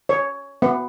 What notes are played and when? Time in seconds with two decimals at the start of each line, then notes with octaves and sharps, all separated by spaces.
0.09 C#5
0.62 B3